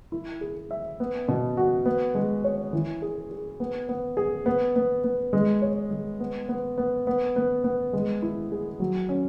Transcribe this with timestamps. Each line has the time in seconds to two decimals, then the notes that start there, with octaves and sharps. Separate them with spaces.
0.12 E4
0.41 G#4
0.71 E5
1.00 B3
1.28 B2
1.57 F#4
1.86 B3
2.15 G#3
2.44 C#5
2.73 E3
3.02 G#4
3.31 G#4
3.60 B3
3.89 B3
4.17 G#4
4.46 B3
4.76 B3
5.04 B3
5.33 G#3
5.62 C#5
5.91 G#3
6.20 B3
6.49 B3
6.78 B3
7.07 B3
7.36 B3
7.64 B3
7.93 G#3
8.22 E4
8.52 G#4
8.80 F#3
9.09 C#4